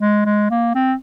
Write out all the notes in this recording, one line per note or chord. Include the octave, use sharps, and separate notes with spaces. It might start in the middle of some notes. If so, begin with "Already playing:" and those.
G#3
G#3
A#3
C4